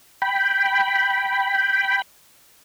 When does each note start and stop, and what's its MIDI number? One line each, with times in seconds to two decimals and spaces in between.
0.22 2.02 79
0.22 2.02 83